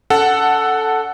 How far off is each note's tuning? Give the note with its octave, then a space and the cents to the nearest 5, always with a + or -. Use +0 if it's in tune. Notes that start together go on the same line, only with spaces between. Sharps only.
C#4 +30 A4 +0 F#5 +5